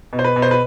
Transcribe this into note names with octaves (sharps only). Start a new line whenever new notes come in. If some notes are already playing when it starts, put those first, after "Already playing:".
B2
C5
B4
B2
C5
B4